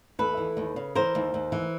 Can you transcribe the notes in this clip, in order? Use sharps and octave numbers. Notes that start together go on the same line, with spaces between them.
D#2 A4 B4
E3
D#2
C#3
E3 A#4 C5
D#2
D#2
E3